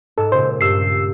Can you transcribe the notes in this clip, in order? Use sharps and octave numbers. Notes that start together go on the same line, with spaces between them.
G#2 A4 E6
A#2 C#3 C5
G2 E6 G6 C7